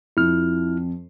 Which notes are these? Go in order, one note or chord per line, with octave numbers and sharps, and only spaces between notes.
F2 E4 F6